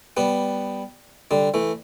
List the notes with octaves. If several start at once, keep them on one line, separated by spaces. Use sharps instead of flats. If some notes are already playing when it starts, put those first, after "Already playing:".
G3 B3
D3 G3
E3 A3